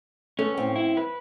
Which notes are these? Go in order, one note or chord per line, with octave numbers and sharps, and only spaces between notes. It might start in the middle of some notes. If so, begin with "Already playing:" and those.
A3 C#4 A4 B4
A2 C4 F5
E4
B4